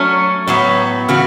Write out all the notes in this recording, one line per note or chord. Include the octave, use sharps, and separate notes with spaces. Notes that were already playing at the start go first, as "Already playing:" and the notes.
Already playing: F#3 A3 C#4
A2 F#3 B3
C#3 E3 B3 F#4